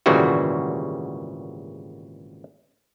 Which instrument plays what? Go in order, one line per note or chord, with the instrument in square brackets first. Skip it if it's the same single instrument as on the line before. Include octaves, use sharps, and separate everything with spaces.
[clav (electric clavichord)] G#1 A#2 C#3 E3 G3 F#4